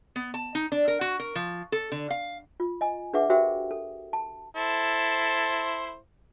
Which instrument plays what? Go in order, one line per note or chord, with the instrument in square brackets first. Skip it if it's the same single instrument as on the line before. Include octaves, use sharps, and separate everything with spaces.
[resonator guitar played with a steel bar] B3
A5
D#4
D4
A#4
F#4
A#4
F3
A4
D3
F5
[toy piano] F4
D#5 G#5
D4 G#4 B4 E5 F#5 D6
F#4 G4 A#4 C5 E5 G5
A4
A5
[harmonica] E4 A4 C5